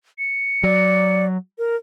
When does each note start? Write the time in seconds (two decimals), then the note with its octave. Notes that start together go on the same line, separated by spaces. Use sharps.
0.19 C#7
0.64 F#3 D5
1.58 A#4